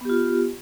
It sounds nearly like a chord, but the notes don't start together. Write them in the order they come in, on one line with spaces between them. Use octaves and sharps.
B3 G4 F4